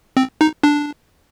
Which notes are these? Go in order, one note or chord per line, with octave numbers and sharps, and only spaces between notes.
C4
D#4
D4